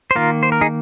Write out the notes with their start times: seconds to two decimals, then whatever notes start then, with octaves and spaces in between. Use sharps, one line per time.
0.11 C5
0.15 D#3 A#3 F4 A#4
0.43 C5
0.52 A#4
0.61 D#4 G#4